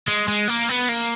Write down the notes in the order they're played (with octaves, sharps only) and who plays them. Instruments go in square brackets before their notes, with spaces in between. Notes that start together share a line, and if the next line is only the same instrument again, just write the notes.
[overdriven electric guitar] G#3
G#3
A#3
B3
A#3